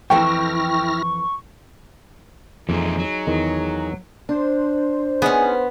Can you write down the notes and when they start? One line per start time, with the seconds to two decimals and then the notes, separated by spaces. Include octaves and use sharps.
0.10 F2 E3 E4 A4 G5 C#6 F6 A#6
2.69 F2 E3 A#3 C4 D#4 G#4
2.99 F#3
3.27 E2 D#3
4.29 D4 C5
5.22 B3 C#4 D#4 G#4